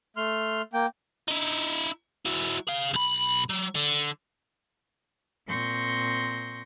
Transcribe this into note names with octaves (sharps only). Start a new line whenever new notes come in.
A3 C6 F6
A#3 G5
D#4 E4
F#3 E4
G#4 F5
B1 B5
F#3
D3
A#2 C4 C6 C#6 G6 A#6